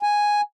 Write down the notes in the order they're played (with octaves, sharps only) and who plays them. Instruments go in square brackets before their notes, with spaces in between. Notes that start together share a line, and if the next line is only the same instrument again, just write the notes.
[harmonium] G#5